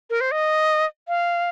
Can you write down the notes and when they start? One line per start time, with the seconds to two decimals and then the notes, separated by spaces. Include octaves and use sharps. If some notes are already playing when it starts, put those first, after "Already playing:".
0.10 A#4
0.21 C5
0.32 D#5
1.08 F5